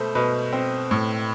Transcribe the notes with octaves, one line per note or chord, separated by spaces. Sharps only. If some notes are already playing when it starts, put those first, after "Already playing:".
Already playing: B2 A3 C5 B5
B2 B4
C4
A2